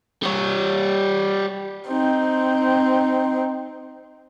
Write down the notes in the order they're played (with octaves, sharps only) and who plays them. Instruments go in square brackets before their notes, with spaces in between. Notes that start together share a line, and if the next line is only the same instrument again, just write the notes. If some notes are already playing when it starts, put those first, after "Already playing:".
[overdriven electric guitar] G3 C#5
[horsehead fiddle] C4 D#4